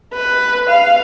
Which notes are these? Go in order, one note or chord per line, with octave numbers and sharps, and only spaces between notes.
B4
F5